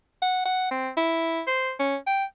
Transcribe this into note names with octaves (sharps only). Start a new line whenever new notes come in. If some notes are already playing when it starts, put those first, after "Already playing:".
F#5
F#5
C4
E4
C5
C#4
G5